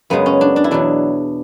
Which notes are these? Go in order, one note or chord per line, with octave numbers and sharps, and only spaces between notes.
F#2 C#3 G#3 B3
C#4
D4
D4
E4
E2 B2 F#3 D4